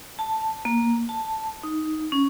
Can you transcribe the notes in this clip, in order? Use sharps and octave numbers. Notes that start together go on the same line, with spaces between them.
A5
A#3
A5
D#4
C#4